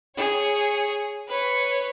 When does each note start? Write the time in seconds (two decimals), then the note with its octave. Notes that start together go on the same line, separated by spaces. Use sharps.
0.16 G#4 C#5
1.28 B4 C#5